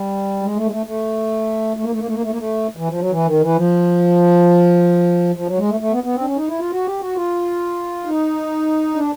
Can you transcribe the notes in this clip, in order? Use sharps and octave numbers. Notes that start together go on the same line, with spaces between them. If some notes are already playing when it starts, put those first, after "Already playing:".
Already playing: G3
G#3
A3
G#3
A3
A3
A3
A#3
A3
A#3
A3
A#3
A3
A#3
A3
E3
F3
F#3
E3
D#3
E3
F3
F3
F#3
G#3
A3
A3
B3
B3
C4
D4
C#4
D#4
E4
F4
F#4
G4
F#4
F4
D#4
D4